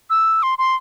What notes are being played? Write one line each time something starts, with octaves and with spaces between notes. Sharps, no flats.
E6
C6
C6